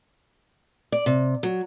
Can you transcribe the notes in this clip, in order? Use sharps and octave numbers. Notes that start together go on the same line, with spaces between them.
D5
C3
F#3